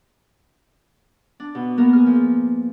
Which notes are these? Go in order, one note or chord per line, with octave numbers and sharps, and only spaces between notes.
D4
B2
A#3 B3 A#4
G#4 F6
F3